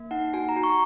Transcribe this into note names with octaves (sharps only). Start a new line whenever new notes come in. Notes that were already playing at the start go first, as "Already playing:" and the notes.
Already playing: A#3
D#4 F#5
F#4 G#5
A#5
F#4
C#6